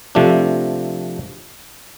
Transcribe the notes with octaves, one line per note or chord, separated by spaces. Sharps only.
C3 F3 A3 D4